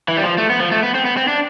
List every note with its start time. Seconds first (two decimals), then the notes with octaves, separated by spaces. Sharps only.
0.08 E3
0.17 G3
0.23 F3
0.38 A3
0.50 B3
0.60 F3
0.72 A3
0.83 B3
0.94 C4
1.05 B3
1.17 C4
1.28 D4